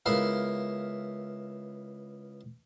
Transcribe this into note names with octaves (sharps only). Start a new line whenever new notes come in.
C#2 B3 E4 A#4 F5